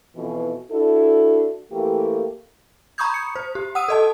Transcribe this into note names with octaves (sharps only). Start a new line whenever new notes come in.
F2 B2 E3
D4 E4 F#4 A4
E3 A3 A#3 G4
A#5 B5 C#6 D#6 G6 G#6
C#7
C5
G4
F#5 D#6 E6 D#7
A4 D#5 A5